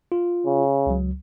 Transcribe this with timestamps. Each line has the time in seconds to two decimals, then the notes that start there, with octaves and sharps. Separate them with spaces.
0.12 F4
0.45 C#3
0.86 C#2 F#3